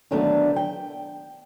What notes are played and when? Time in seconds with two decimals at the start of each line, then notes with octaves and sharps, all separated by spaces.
0.11 D3 D#3 F#3 A3 B3 D4
0.56 G5